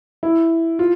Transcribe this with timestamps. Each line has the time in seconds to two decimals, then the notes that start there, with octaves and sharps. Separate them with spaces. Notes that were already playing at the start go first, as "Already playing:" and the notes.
0.23 E4
0.79 F4